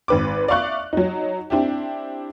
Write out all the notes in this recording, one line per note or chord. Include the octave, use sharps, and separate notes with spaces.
G#1 B4 D6
D5 E5 F5 C#6 F#6
F#3 D#4
C4 D4 E4 G4